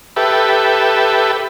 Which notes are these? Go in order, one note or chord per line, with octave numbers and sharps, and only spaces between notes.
G4 A4 B4 E5